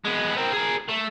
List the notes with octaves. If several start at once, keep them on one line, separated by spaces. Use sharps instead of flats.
G#3 B3
C4 A#4
G#4 A#4
A3